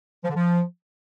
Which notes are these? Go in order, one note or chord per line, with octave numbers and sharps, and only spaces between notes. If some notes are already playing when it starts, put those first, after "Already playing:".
F3
D3
F3